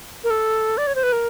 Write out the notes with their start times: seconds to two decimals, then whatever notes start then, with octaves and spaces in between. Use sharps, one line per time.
0.24 A#4
0.30 A4
0.78 D5
0.87 C#5
0.95 C5
1.03 B4
1.12 A#4